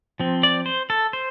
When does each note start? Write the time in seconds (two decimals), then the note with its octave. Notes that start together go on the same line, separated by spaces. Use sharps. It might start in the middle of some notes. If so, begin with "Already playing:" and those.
0.20 F3 C4
0.43 D5
0.66 C5
0.90 A4
1.13 C5